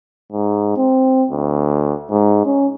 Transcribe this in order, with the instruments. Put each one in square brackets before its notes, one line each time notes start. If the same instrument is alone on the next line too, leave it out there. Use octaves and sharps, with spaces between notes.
[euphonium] G#2
C4
D2
G#2
C#4